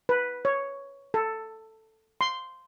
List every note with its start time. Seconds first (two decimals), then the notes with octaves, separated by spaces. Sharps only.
0.09 B4
0.45 C#5
1.14 A4
2.21 C6